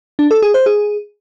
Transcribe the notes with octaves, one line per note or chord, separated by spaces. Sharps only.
D4
A4
G#4
C5
G#4